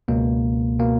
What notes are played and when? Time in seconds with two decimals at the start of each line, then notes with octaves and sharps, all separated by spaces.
0.08 C#2 B2 A#3
0.79 B2 A#3